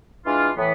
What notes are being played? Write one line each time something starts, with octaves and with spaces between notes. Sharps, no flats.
E3 G#3 D4 F4
A2 E3 B3